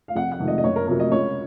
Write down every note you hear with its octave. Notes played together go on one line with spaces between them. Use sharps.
F5
F1 F#5
F#5
F2 C3 D#3 G#3
D#5
D#5
F#1 C#5
A#4
F2 C3 F#3 A#4
D#5
C#2 C#5